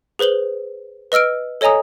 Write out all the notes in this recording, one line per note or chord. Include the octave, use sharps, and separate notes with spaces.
G#4 B4 C5 F#7 G7
B4 D#5 E6 F6 D7
A4 C#5 D#5 G#5 A#5 D#6